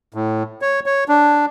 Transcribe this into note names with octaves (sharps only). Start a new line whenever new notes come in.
A2
C#5
C#5
D4